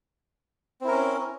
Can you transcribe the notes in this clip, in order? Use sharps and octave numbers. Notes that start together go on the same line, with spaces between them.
C4 C#4 E4 A#4